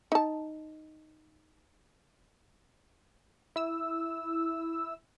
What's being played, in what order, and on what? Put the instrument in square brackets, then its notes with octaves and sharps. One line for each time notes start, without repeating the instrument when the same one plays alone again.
[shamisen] D#4 A5
[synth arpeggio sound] E4 E6